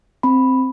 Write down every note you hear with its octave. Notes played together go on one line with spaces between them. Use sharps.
C4 B5